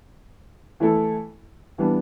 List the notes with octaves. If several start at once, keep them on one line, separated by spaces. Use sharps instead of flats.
E3 A3 E4 A4
E3 G3 B3 D4